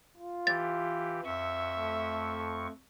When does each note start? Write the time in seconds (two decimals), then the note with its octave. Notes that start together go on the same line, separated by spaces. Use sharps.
0.18 F4
0.47 E3 G4 A6
1.25 F2 E5 C#6
1.78 A3